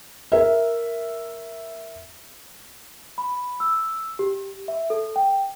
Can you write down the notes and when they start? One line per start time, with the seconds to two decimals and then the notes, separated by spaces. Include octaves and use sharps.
0.32 A#4 E5
3.18 B5
3.60 E6
4.19 G4
4.68 E5
4.90 A4
5.16 G5